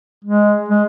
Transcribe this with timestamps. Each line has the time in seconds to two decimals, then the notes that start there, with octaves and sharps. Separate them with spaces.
0.24 G#3
0.68 G#3